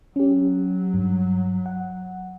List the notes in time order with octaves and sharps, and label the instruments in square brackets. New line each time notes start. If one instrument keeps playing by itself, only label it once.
[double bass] F#3 [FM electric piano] C#4 G4
[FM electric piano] G2
F#5